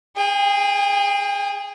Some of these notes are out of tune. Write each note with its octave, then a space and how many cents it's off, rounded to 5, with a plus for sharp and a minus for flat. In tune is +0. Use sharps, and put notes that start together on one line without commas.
G#4 +0 G5 +40